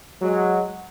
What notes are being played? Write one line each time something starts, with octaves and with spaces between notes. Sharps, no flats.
F#3 G#3